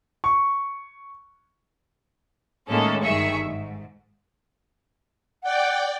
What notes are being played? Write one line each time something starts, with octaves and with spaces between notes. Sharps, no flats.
C#6
A2 D#3 G#3 A#3 C#4 A4
G1 G2 D#3 G#4 E5 C#6
G#2
D5 F#5 G5